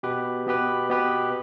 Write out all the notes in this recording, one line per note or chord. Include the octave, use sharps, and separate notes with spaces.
B2 B3 G4 B4
B2 B3 G4 B4
B2 B3 G4 B4